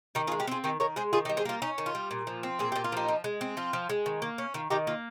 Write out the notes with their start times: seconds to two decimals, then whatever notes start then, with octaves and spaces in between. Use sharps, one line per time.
0.15 D#3 D#4 G4
0.27 F4 G#4
0.32 G#3
0.40 G4 A#4
0.47 C4 F4 G#4
0.64 D#3 D#4 G4
0.80 D#3 A#4 C#5
0.96 G#3 G#4 C5
1.13 D#3 F4 G#4
1.25 D#4 G4
1.29 G3
1.37 G#4 C5
1.45 A#3 F4
1.62 C#4 D#4
1.78 D#3
1.86 F4
1.95 G3
2.11 A#2
2.27 F3
2.43 C4
2.59 A#2 G#4
2.72 A#2 G4
2.84 F4
2.92 F3 D#4 G4
3.08 F3
3.24 G#3
3.41 C4
3.57 F3 F4
3.73 F3
3.90 G#3
4.06 D#3
4.22 A#3
4.38 C#4
4.54 D#3 F4
4.70 D#3 D#4 G4
4.87 A#3 F4